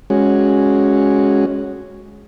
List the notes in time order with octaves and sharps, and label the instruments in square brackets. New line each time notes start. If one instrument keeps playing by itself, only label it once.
[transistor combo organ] G#3 C#4 F#4